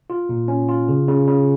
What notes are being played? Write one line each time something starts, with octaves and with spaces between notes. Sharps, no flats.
F4
A#2
C#4
F4
C#3
C#3
C#3